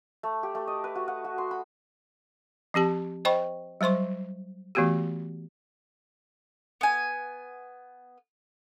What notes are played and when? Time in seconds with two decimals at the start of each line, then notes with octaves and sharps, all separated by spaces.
0.23 A3
0.43 G4
0.55 A3
0.67 D#5
0.84 B4
0.95 F#4
1.08 F#5
1.24 F#4
1.38 C6
1.51 B5
2.74 F3 C4 G4 A5
3.25 C5 D#5 G5 B5 C#6
3.81 F#3 G3 C5 C6 C#6
4.75 E3 A3 B3 F#4 G4
6.81 B3 G#5